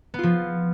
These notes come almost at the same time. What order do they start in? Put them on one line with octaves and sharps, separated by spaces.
B3 F4 F3